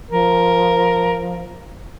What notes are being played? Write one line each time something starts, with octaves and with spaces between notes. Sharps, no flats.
F3 A#4